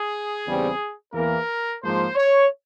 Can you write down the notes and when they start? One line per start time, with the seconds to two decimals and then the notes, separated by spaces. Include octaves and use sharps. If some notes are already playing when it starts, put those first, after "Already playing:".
Already playing: G#4
0.46 E2 C#3 G3 C4
1.13 E2 E3 A#3 A#4
1.82 G#2 F3 A#3 C5
2.16 C#5